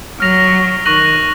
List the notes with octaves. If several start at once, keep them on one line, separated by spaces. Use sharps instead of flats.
F#3 F6 A#6 F7
D#3 C#6 F#6 A#6 D#7 F#7